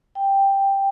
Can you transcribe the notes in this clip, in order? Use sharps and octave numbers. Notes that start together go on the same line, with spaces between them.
G5